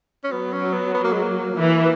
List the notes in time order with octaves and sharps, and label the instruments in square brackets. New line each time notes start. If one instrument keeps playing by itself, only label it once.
[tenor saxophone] C#4
[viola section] F#3 [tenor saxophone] B3
[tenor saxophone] C#4
B3
B3
A#3
G#3
A#3
[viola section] E3